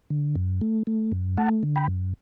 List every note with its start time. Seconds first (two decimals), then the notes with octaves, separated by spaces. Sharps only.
0.10 D3
0.36 F#2
0.61 A3
0.87 A3
1.12 F#2
1.37 A3 F#5 A5
1.63 D3
1.76 G5 B5
1.88 F#2